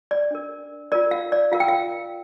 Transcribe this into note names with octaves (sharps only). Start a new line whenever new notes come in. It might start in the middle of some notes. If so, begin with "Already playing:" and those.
D5
D4 A#4
F4 A#4 D5
F5
D5
F4 A#4 F5
G5
F5